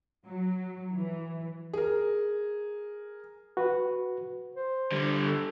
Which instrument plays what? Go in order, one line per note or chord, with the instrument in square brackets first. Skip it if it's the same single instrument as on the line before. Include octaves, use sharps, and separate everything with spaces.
[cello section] F#3
E3
[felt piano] G#4 A#4
[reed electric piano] F#4 B4
[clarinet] C5
[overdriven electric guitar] D3 G3
[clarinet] A4